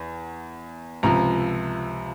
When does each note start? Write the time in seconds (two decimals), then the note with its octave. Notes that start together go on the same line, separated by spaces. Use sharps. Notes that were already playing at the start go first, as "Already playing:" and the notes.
Already playing: E2
1.03 C#2 C3 F3 A#5